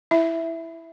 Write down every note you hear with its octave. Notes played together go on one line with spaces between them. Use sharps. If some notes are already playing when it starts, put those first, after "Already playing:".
E4 E5